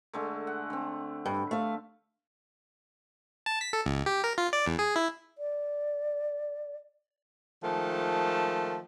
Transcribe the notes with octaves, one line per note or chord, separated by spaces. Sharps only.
D3 G#3 A3
F#5
D3 C4
G2
A3 F5
A5
B6
A4
C#2
G4
A#4
F4
D5
E2
G#4
E4
D5
D#3 F3 G#3 A3